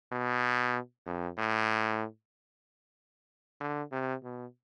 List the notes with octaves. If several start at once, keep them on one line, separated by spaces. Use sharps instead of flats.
B2
F2
A2
D3
C3
B2